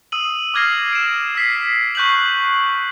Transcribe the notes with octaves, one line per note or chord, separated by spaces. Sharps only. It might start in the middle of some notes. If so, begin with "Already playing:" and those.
D#6 E6 D#7 F#7
D6 F6 G#6 A#6 C7
D7 E7
E6 B6 C7
C#6 F#6 G6 B6 F#7